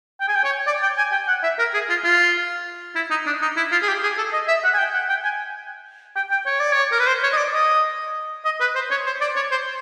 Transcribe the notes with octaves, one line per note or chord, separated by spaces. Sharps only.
G5
G#5
G5
C#5
D5
G5
G#5
G5
F#5
E5
A#4
G#4
F4
F4
E4
D#4
D4
D#4
E4
F4
G#4
G4
G#4
A4
D#5
E5
F#5
G#5
G5
F#5
G5
G#5
G5
G5
C#5
D5
C#5
A#4
B4
C5
C#5
D#5
D5
D#5
D#5
B4
C5
C#5
C5
D5
C#5
C5